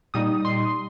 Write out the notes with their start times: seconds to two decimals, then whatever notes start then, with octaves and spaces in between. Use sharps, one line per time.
0.14 A#2 G3 D#4 D#6
0.45 C6